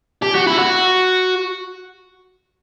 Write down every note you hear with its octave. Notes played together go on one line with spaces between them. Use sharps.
G4
F#4
E4
F#4